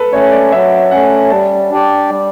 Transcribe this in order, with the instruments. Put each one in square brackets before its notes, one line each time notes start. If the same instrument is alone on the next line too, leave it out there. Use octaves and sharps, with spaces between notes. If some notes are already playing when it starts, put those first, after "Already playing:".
Already playing: [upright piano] A4 B4
[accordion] A3 C#4 [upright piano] C#5
[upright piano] D5
[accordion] F#3 [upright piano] E5
[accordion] A3 C#4 [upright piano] F#5
[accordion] G3 [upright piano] A5
[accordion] D4 G4 D5
G3